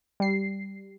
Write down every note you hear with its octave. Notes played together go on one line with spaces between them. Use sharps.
G3 C7